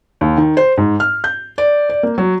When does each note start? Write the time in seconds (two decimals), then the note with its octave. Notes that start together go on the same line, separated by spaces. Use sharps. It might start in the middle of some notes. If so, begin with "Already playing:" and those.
0.21 D#2
0.37 D#3
0.57 C5
0.77 G#2
1.00 F6
1.24 G6
1.58 D5
1.90 D5
2.03 A#3
2.18 F#3